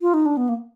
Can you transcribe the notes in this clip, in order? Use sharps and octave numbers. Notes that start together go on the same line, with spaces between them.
F4
D#4
D4
B3
A#3